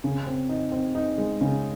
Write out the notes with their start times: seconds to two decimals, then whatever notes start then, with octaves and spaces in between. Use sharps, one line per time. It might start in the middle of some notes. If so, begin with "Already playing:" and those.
0.04 C#3
0.26 C4
0.49 D#4
0.72 C4
0.95 D#4
1.18 G#3
1.41 C#3